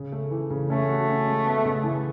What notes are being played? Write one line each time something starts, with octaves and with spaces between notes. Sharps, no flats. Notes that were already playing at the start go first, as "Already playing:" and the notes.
Already playing: C#3
A3
E3
C#3
A3 C#4
F#4
C#4
G#3
B3
C#3
E3